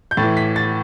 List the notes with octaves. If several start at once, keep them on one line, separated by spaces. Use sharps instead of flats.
G6
A2 E3 A6
B6
A6